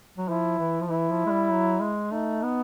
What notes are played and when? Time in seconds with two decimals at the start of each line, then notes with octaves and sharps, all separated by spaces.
0.17 F#3
0.28 F3 E4
0.59 E3
0.81 F3
0.89 E3 E4
1.10 F3
1.26 G#3
1.30 G3
1.51 F#3
1.81 G#3
2.12 A3 D#4
2.42 B3